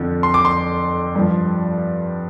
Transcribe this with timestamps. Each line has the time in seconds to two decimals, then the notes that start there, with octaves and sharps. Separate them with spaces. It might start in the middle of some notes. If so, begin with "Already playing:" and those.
Already playing: F2 D3 F3
0.23 C6
0.34 D6
0.45 C6
1.15 G2 F3